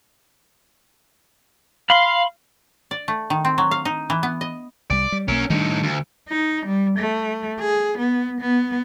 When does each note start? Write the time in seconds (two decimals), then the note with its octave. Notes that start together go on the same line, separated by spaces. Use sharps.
1.90 F5 B5 C6
2.91 D5
3.08 A3
3.30 D#3
3.45 C4
3.58 F#3
3.71 F5
3.85 D#4
4.10 E3
4.23 B3
4.41 D#5
4.90 C2 G3 D5
5.12 G3
5.28 B1 A#3 C#4 A#4
5.50 A2 D#3 G3 D4 D#4
5.83 D2
6.29 D#4
6.66 G3
6.99 A3
7.60 G#4
7.98 B3
8.41 B3